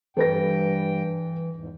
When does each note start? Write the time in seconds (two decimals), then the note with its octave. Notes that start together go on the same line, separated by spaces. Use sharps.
0.17 G2 E3 A4 B4 G5 A#6
1.56 E2 G#2